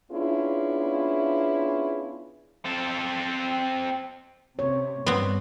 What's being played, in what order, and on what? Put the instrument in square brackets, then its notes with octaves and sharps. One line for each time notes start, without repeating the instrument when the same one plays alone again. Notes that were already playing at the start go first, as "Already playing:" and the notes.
[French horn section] B3 C#4 D4 E4 F4 G#4
[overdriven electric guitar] C4 A4
[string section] C3 [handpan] C#5
[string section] G2 [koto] B3 C4